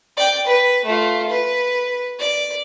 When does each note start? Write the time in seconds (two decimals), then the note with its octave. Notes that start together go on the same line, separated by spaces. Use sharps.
0.17 D5 G5
0.47 B4
0.85 A3 F4
1.30 B4
2.19 D5